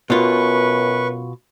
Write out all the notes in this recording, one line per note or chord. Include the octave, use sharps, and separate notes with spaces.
F#2 B2 F4 B4 C#6